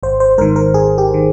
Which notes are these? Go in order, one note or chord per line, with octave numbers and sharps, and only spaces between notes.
G#1 C5
C5
G#2 D#3 A#4
A#4
G#1 G#4
G4
D#3